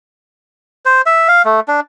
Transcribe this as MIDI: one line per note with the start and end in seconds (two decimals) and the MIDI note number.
0.85 1.01 72
1.06 1.28 76
1.28 1.42 77
1.45 1.60 57
1.68 1.80 62